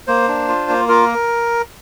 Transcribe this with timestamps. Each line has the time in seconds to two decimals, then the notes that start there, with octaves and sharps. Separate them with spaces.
0.07 A#3 C5
0.28 D4
0.48 F4
0.69 A#3
0.89 F4 A#4